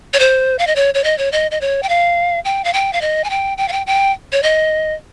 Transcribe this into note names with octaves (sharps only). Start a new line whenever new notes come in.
C#5
C5
F5
D#5
C#5
C#5
D#5
C#5
D#5
D#5
C#5
G5
F5
G5
F5
G5
F5
D#5
G#5
G5
G5
F5
G5
G5
C#5
D#5